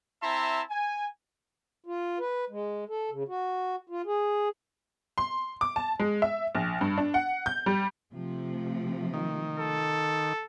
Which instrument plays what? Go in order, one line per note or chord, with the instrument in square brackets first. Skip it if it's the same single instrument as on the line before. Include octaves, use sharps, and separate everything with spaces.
[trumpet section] C4 E4 E5 A5 A#5 C6
G#5
[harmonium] F4
B4
G#3
A4
C#3
F#4
F4
G#4
[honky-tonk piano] C6
D6
A5
G#3
E5
A#1
G2
D4
F#5
G6
G3
[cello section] C3 F3 A3
[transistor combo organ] D#3
[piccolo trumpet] A4